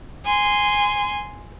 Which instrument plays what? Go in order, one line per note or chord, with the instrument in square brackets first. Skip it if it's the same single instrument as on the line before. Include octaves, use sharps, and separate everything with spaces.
[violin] G#5 C6